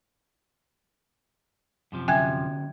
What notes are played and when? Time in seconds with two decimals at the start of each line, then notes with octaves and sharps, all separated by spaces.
1.92 F#2 C3 F3
2.08 D3 F#3 C#4 E5 G5 G#5 F#6 G#6